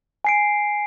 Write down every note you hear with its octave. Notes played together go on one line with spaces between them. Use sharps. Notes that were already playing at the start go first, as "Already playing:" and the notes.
G#5 C7 D7